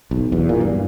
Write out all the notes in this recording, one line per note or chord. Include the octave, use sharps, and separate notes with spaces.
B1
E2
A#2
G2